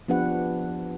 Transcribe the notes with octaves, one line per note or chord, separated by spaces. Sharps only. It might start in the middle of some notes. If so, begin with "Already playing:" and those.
F3 B3 D4 G4 B4 F#5